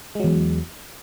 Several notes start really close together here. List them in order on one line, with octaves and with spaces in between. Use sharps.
G#3 F#3 E2